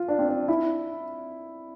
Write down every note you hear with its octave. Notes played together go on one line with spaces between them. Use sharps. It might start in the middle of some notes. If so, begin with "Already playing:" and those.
Already playing: F4
D4
C4
D4
E4